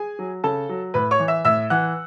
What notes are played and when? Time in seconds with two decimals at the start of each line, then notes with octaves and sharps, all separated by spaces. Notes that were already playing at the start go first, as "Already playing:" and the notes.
Already playing: G#4 G#5
0.19 F#3
0.44 C#3 A4 A5
0.69 F#3
0.94 A2 B4 B5
1.11 C#5 C#6
1.19 E3
1.28 E5 E6
1.45 A2 E5 E6
1.70 E3 F#5 F#6